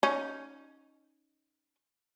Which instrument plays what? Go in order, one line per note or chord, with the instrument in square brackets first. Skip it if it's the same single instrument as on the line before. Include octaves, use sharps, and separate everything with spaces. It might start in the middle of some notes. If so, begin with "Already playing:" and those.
[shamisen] C#4 D#4